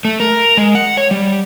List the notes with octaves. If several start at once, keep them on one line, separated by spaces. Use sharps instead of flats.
A3
A#4
G#3
F#5
C#5
G3